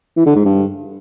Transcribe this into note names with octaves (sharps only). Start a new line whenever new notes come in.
E3
D3
G#2
G2